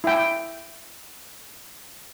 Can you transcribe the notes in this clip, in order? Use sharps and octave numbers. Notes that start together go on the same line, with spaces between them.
E4 G5